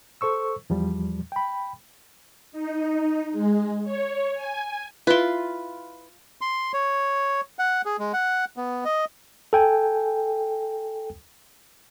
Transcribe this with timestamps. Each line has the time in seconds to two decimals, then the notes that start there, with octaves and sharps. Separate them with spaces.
0.21 A4 C5 C#6 E6
0.70 E2 F3 G3
1.32 G5 B5
2.52 D#4
3.32 G#3
3.84 C#5
4.34 G#5
5.07 E4 F4 B4 C6
6.41 C6
6.73 C#5
7.59 F#5
7.85 G#4
7.99 G#3
8.13 F#5
8.57 B3
8.85 D#5
9.53 A4 G5 G#5